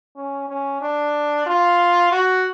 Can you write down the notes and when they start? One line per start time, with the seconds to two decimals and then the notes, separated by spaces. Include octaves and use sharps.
0.16 C#4
0.48 C#4
0.81 D4
1.46 F4
2.12 F#4